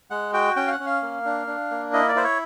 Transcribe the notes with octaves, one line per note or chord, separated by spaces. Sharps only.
G#3 F#5
F#4 G5
C#4 G5
F5
F#5
C#4
F5
A#3
D4
D4
A#3
E4 D#5
D5
E4 C5
C#5